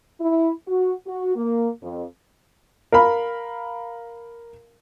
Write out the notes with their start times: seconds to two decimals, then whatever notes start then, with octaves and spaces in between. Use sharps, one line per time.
0.20 E4
0.67 F#4
1.06 F#4
1.36 A#3
1.81 F2
2.92 A#4 F5 B5